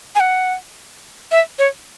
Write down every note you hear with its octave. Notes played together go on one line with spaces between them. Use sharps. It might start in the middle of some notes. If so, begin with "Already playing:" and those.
G#5
F#5
E5
C#5